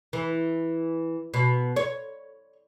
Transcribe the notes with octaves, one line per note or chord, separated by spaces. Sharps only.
E3
B2
C#5